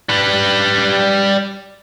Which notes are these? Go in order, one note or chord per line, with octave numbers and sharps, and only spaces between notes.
G3 B4